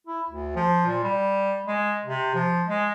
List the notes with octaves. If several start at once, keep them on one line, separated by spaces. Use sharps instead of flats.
E4
D2
F3
A#2
G3
G#3
C3
F3
G#3